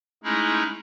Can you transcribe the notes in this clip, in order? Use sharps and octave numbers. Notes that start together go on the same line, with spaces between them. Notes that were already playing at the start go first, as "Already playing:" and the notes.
G#3 A3 C#4 D#4 E4 G#4